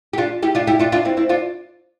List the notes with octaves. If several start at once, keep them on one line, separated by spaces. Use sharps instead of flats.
G4
D4 F4
E4 G4
D4 F4
E4 G4
D4 F4
D4 F4
C4 E4
C4 E4
D4 F4